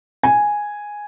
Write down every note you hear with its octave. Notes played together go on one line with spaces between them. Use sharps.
G#5